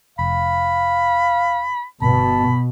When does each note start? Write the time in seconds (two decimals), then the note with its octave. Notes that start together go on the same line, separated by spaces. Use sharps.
0.19 F1 F5 B5
2.02 G1 B2 A5 B5